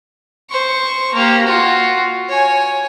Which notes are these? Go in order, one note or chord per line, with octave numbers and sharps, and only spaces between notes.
C5 C#6
A#3 G4
F4 F#4
C#5 G#5